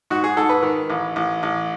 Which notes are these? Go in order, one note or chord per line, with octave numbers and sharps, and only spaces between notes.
G#2 F#4
G#4
G#2 A4
B4
D#3
A1
A1
A1